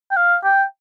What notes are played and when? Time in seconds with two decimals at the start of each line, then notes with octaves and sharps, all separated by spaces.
0.11 G5
0.17 F5
0.44 G5